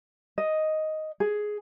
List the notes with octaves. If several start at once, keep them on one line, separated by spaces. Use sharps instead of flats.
D#5
G#4